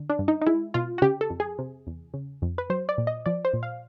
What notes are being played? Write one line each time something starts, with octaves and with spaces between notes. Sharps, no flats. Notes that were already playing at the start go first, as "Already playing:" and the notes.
Already playing: D3
D4
G2
D#4
D#4
G#3 E4
B2 F4
F#4
C#3 G4
A4
F2
G#4
C3
E2
C#3
F2
B4
F#3 C5
D5
A#2
D#5
F3 D5
C5
A#2
F5